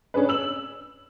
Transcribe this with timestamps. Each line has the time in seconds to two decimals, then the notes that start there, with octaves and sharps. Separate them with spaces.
0.14 C#4 D4 G#4 B4
0.29 E6 F#7